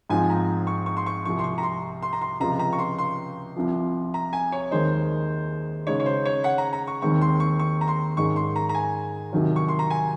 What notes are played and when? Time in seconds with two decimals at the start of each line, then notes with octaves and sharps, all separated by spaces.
0.10 G#2 F3 C4 F4 G#5
0.30 A#5
0.67 C#6
0.86 C#6
0.97 C6
1.06 C#6
1.25 C2 C3 F3 C#6
1.39 C6
1.44 C#6
1.58 A#5
1.63 C6
2.03 C6
2.13 A#5
2.21 C6
2.40 C#2 C3 F3 C4 F4 A#5
2.59 A#5
2.73 C#6
2.79 C6
2.98 C6
3.56 C2 C3 F3
4.14 A#5
4.33 G#5
4.52 C#5
4.71 D#2 D#3 G#3 D#4 C5
5.87 C#3 G#3 D#4 C#5
6.00 C#5
6.06 C5
6.26 C#5
6.44 F#5
6.58 A#5
6.73 A#5
6.87 C#6
7.02 D#2 D#3 G#3 C4 C#6
7.21 C6
7.40 C#6
7.59 C#6
7.81 A#5
7.88 C6
8.17 G#2 D#3 G#3 C#4 C#6
8.36 C6
8.56 A#5
8.69 A#5
8.74 G#5
9.33 C2 C3 D#3 F#3
9.56 C#6
9.68 C6
9.79 A#5
9.90 G#5